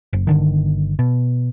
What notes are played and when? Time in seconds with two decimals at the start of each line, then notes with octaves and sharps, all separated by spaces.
0.13 F#1
0.27 G1 D3 D#3
0.99 B2